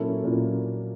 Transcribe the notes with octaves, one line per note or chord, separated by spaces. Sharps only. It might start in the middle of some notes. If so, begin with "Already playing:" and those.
Already playing: A#2 F#3 A#3 C#4 E4 A4
A#2 F#3 A#3 C#4 E4